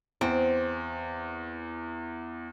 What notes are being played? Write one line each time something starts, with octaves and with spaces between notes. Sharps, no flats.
E2 C4